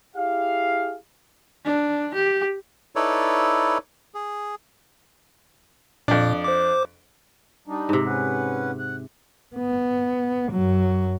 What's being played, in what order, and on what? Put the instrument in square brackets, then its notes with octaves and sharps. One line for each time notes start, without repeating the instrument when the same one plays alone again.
[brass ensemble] E4 G4 G#4 F5
[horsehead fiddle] D4
G4
[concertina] D#4 E4 A4 B4 C#5 D5
G#4
[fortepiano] F2 D4 [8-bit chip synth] A#2
[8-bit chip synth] C5 D6
[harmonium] G3 D4 D#4
[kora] G#2 C3
[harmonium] C#4 B4 F#5
F#5
[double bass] B3
F#2 F#3